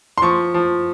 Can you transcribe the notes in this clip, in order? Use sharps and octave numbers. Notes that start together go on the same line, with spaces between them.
C6
F3 C#6
F3